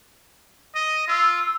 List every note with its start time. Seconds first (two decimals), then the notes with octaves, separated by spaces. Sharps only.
0.75 D#5
1.08 F4 E6